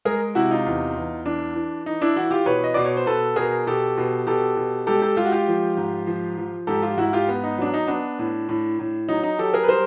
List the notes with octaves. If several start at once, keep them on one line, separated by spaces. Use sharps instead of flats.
G#3 G#4 A#4
C3 E4 F#4
D#4 F4
E2
E2
E3 D4
E3
E3 D#4
D4 E4
E3 E4 F#4
F4 G4
B2 B4 C#5
D#5
B2 D5
C#5
C5
B2 A4 B4
B2 G#4 A#4
B2 G4 A4
B2
B2 G4 A4
B2
G#3 G4 A4
G4 A4
G#3 F4 G4
F#4
F4 G4
F3
G#2
F3
F3
G#2 G4 A4
F4 G4
G#2 E4 F#4
F4 G4
B3
D#4
F#3 D4
D#4
B3 D4
A2
A2
A2
F#3 D#4
D#4
F#3 G4 A4
G#4 A#4
B4
G3 A#4 C5